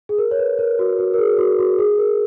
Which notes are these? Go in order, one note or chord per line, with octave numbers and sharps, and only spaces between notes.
G#4
A#4
C#5
B4
A#4
F#4
F#4
A#4
G#4
F#4
F#4
G#4
A#4